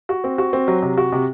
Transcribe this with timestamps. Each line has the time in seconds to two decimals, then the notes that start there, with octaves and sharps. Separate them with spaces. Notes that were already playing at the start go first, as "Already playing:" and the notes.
0.09 F#4
0.24 C4
0.38 F#4
0.53 C4
0.68 F#3
0.82 C3
0.97 F#4
1.13 C3